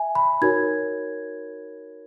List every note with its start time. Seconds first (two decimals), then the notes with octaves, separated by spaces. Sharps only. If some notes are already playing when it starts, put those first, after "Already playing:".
Already playing: E5 G#5
0.15 B5
0.42 D#4 F#4 A#4 C#5 G#6